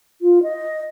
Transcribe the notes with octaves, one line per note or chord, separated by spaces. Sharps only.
F4
D#5